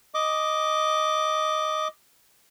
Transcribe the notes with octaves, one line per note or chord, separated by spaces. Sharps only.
D#5 D6